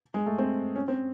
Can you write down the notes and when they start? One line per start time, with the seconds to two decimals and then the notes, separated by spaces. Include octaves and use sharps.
0.14 G#3
0.26 A3
0.38 C4
0.75 C#4
0.88 C4